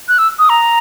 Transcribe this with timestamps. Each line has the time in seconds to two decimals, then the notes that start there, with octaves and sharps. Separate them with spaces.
0.08 F#6
0.18 E6
0.39 D#6
0.49 A#5